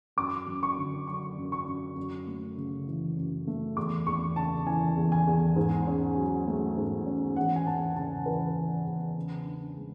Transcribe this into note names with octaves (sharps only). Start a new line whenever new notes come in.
F#2 D6
F#2
C#6
D3
F#3 C#6
F#2
C#6
F#2
F#2
A3
C#3
E3
F#2
A3
E2 D6
E2 C#6
C#3 A5
E3 G#5
E2
G#5
E2
G#2
C#4
F#3
A3
G#2
C#4
E2 F#5
G#5
E2 A5
C#3 A5
E3 B4
E2
E2
C#3
D4
G#3